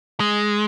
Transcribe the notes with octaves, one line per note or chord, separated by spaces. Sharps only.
G#3